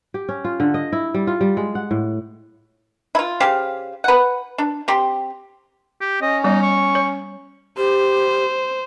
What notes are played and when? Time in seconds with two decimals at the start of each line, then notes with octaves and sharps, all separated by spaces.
0.14 G4
0.29 C#4
0.44 F4
0.60 D3
0.74 D#5
0.92 E4
1.14 G3
1.27 F4
1.41 G3
1.57 G#3
1.75 F#5
1.91 A2
3.15 E4 F4
3.40 C#3 G4 C5 F5
4.04 B4 F#5
4.58 D4
4.88 C4 G4 C6
6.01 G4
6.22 C#4 D#5
6.44 G3 B3 D#4 D#5
6.62 C#6
6.95 C#5
7.77 G4 C5